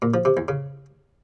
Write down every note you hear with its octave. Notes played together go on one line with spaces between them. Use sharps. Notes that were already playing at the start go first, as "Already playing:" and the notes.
A#2
F3
C3
E2
C#3